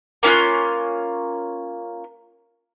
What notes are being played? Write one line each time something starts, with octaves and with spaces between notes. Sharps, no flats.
A#3 C#4 F4 F#6